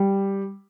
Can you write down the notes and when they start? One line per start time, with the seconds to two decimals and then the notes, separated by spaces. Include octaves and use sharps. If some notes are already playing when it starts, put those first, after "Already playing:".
Already playing: G3